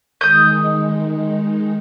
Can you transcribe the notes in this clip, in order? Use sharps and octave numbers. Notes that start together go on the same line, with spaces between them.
D#3 G#3 D#4 D#6 G6